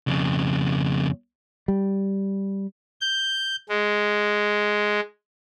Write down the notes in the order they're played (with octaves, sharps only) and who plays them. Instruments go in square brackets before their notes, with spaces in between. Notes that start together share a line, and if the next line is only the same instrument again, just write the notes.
[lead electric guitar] F2 C#3
[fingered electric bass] G3
[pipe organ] G6
G#3